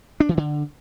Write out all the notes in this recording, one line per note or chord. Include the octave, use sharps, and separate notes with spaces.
D4
E3
D3